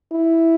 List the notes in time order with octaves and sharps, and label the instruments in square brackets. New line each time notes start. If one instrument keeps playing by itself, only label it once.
[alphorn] E4